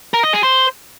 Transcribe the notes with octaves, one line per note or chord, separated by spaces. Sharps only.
A#4
D#5
G#4
C5